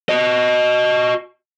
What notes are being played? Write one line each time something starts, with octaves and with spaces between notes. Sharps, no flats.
F#4 D#5